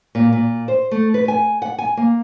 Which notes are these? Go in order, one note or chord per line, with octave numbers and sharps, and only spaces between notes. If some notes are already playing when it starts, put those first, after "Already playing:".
A#2
A#2
C5
A3
B4
G#5
F#5
G#5
A#3